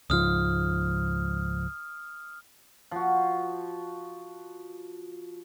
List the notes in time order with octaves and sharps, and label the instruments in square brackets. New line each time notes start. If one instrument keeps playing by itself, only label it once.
[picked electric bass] C#2 G#2 F3 [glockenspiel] D#6 F6
[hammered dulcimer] F3 F#4